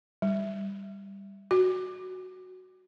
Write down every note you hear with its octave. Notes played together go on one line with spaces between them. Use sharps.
G3
F#4